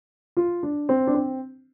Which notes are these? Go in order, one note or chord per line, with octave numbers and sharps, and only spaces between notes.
F4
D4
C4
D4
C4